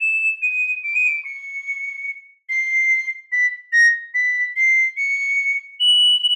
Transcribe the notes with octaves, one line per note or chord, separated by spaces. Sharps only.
E7
D#7
D7
D#7
D7
C#7
C7
B6
A#6
B6
C7
C#7
F#7